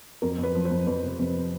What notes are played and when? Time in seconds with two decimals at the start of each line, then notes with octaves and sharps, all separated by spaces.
0.22 F2 A#4
0.38 F2
0.43 B4
0.55 F3
0.65 C5
0.71 F2
0.87 F2 B4
1.03 C3
1.19 F2